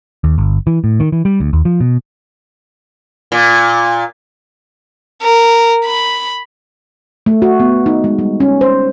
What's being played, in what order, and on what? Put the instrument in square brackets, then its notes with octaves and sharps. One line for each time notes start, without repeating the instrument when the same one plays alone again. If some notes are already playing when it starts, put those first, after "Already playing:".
[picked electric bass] D#2
G1
E3
A2
D#3
E3
G3
D2
D#2
F3
B2
[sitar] A#2
[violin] A#4
B5
[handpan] A3
F#4
B3
D#4
G#3
G3
C#4
C5